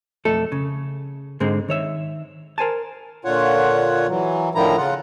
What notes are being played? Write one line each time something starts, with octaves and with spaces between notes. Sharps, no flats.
B1 F2 A3 A4
C#3
G#2 D3 G#3 C4
D#3 C#5 E5
A#4 C5 G#5 A5
A#2 D3 F4 C#5 F#5
E3 F#3
A2 D3 D#3 F3 E4 A#5
C#3 F4 F#5